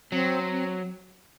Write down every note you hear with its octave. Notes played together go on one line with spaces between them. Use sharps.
F#3 C4
C4